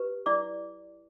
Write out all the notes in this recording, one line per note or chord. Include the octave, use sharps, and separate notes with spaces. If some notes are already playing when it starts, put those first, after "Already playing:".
Already playing: G4 B4
E4 D5 D6